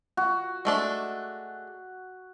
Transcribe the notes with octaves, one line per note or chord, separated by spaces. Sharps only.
F#4
G#3 A3 D4